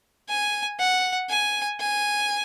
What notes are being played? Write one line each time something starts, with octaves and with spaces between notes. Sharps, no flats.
G#5
F#5
G#5
G#5